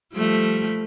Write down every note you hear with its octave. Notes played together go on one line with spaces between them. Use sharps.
F3 G3 A3